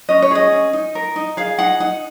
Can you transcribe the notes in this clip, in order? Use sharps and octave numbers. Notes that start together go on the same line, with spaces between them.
C#4 D#5
C#5
G#4 D#5
C#4
D#4
A#4
D#4
G#4 F5
D#4 F#5
D#4 F#5